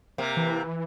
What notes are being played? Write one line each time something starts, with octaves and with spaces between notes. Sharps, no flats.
C3 A#3
E3